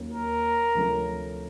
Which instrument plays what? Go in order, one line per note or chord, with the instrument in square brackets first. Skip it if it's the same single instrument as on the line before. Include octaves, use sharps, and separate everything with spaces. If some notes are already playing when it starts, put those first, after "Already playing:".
Already playing: [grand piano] D#2 D#3 F#3 A#3 C#4
[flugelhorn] A#4
[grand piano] D2 C3 F3 A3 C#4